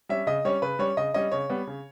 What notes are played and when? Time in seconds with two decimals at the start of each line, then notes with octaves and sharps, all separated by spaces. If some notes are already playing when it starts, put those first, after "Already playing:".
0.09 G3 C#4 E5
0.27 C#3 D#5
0.45 G3 C#4 C#5
0.62 C#3 B4
0.79 G3 C#4 C#5
0.97 C#3 D#5
1.14 G3 C#4 D#5
1.32 C#3 C#5
1.50 G3 B3
1.67 C#3